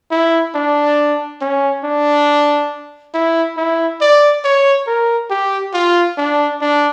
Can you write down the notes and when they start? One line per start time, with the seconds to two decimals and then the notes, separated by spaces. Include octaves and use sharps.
0.11 E4
0.55 D4
1.41 C#4
1.84 D4
3.14 E4
3.57 E4
4.01 D5
4.44 C#5
4.87 A#4
5.30 G4
5.73 F4
6.17 D4
6.61 D4